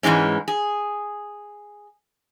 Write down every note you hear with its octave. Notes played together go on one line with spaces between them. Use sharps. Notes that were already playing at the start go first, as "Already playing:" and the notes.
G#2 B2 E3 G#3 C#4
G#4